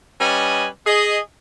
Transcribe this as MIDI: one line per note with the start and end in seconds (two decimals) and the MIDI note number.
0.19 0.66 55
0.19 0.66 61
0.19 0.66 71
0.19 0.66 75
0.19 0.66 80
0.86 1.18 68
0.86 1.18 75